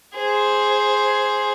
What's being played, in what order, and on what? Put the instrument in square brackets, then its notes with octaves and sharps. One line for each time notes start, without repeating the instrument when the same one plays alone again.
[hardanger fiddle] G#4 C5